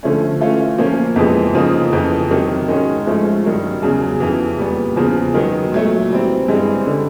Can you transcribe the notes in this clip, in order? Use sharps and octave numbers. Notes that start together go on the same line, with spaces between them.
D3 F3 A3 C#4
E3 A3 C#4 F4
A#2 F3 A#3 C#4
F2 C3 E3 G#3 B3
F2 C#3 F3 A#3 D#4
F2 C#3 E3
C3 D#3 F#3
G#2 D#3 G#3 C#4
G#2 F3 A3 C#4
G2 D#3 F#3
E2 C#3 F#3
F2 C#3 E3
A#2 G3 B3
E2 C#3 F3
D#3 F#3 B3
A#2 F#3 A3
E3 G3 C4
G2 E3 G#3 C4
D3 G3